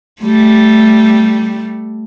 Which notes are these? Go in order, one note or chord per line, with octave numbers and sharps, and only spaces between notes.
G3 A3